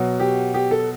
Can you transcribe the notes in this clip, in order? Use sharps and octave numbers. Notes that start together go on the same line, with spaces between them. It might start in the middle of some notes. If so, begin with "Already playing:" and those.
Already playing: B2 F#3
G4
G4
A4